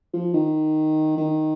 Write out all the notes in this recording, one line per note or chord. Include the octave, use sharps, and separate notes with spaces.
F3
D#3
D#3